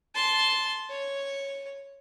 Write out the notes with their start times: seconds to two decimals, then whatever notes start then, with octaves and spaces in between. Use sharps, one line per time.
0.14 A5 C6
0.90 C#5